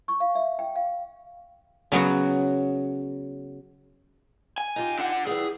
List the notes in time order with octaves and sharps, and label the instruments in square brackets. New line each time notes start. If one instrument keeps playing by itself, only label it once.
[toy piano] C#6
F5
E5
G5
F5
[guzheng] C#3 F#3 B3 F#4
[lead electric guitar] G#5
[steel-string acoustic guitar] D#4 F4 G4
[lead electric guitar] D3 F#5
[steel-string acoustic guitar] E3 G3 [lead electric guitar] G#4